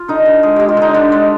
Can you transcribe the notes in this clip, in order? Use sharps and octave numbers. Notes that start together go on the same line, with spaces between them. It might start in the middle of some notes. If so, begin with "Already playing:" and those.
Already playing: F4
D3 D#4
D3
G#3 G#4
G#3 G4
F4
D3 D#4
D3 D4
G#3